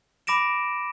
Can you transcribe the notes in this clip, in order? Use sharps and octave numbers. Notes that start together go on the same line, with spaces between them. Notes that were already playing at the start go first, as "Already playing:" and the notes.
B5 D6 A#6 D7 E7